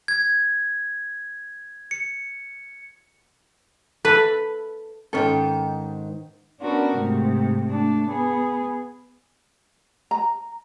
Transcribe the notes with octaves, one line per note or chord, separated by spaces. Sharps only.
G#6
C#7
A4 B4 B5
G#2 D#3 C#4 A4
B3 C#4 D4 F#4 A#4
G#2 C3 A3
A3 D4
B3 G#4
A#5